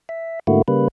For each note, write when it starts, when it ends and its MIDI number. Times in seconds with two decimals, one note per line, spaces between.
0.09 0.39 76
0.47 0.62 44
0.47 0.62 50
0.47 0.62 57
0.47 0.62 58
0.47 0.62 64
0.47 0.62 66
0.68 0.88 49
0.68 0.88 55
0.68 0.88 58
0.68 0.88 71